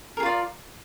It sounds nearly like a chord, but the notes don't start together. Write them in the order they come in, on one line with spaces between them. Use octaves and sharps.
A#4 G#4 F4 D5